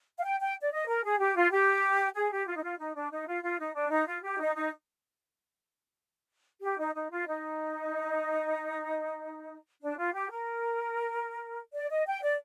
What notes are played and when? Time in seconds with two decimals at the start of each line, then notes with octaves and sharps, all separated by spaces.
0.17 F5
0.23 G5
0.40 G5
0.61 D5
0.71 D#5
0.87 A#4
1.04 G#4
1.20 G4
1.35 F4
1.51 G4
2.15 G#4
2.31 G4
2.47 F4
2.56 D#4
2.63 F4
2.79 D#4
2.95 D4
3.11 D#4
3.27 F4
3.43 F4
3.59 D#4
3.75 D4
3.90 D#4
4.07 F4
4.23 G4
4.39 D#4
4.55 D#4
6.62 G4
6.79 D#4
6.94 D#4
7.10 F4
7.27 D#4
9.82 D4
9.98 F4
10.14 G4
10.30 A#4
11.74 D5
11.90 D#5
12.06 G5
12.22 D5